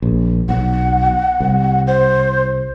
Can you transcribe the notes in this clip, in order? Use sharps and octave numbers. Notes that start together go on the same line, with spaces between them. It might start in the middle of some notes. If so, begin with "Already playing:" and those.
A#1
B1 F#5
C2
C5